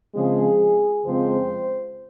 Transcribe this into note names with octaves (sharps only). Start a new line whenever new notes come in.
C#3 F3 G#3 C4 G#4
F2 C#3 F3 G#3 C4 C5